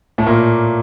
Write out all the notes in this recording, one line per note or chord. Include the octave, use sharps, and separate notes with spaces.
A2 A3
A#2 A#3